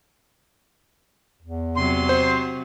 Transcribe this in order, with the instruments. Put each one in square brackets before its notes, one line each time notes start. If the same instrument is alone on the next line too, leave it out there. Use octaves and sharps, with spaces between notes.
[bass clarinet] E2
[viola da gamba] C3 F#3 [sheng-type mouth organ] C6
[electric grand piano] C5